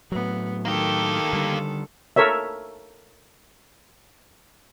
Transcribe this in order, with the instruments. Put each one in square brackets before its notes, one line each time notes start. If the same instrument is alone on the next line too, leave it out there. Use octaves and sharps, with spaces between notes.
[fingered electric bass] A2 F#3 [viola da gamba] B3
[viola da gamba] D#3 A4 [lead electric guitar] A#3 G4
[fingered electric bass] D3 G3
[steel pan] A4 A#4 C#5 E5